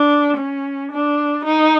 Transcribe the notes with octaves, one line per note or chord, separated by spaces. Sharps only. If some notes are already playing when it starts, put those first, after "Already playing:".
Already playing: D4
C#4
D4
D#4